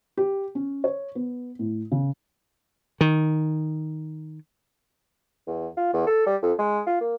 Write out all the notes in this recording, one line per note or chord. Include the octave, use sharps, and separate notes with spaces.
G4
C#4
C#5
B3
A2
C#3
D#3
E2
F4
E2
A4
G3
F2
G#3
F4
A#3